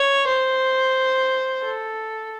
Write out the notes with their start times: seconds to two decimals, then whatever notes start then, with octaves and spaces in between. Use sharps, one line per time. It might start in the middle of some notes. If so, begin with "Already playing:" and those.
Already playing: C#5
0.27 C5
1.63 A4